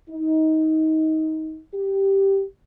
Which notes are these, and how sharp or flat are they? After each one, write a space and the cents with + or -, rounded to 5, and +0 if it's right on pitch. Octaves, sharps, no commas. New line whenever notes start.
D#4 +20
G4 -5